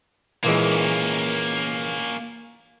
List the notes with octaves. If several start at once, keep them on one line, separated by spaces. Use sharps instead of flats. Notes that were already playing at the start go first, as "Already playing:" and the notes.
A#2 E3 G#3 A#3 C#4